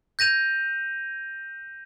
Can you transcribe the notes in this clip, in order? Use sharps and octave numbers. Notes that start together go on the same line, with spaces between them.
G6 A#6 D#7 F7